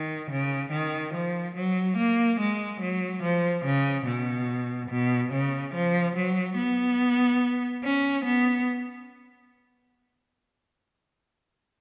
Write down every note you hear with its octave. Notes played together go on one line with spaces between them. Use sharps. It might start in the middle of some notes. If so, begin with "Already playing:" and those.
Already playing: D#3
C#3
D#3
F3
F#3
A#3
G#3
F#3
F3
C#3
B2
B2
C#3
F3
F#3
B3
C#4
B3